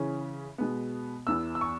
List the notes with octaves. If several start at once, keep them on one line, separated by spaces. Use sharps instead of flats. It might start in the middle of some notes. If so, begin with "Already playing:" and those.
Already playing: C#3 E3 C#4
B2 G#3 B3
E2 E3 B3 E6
E6
C#6